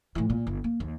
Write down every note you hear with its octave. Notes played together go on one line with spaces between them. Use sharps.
A2 E3
A#2
G1
A#3
D#2